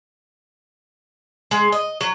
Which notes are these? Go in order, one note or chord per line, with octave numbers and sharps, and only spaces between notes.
G#3
D#5
F#3